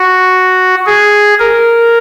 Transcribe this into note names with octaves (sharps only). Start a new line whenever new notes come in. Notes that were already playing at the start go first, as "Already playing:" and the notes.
Already playing: F#4
G#4
A#4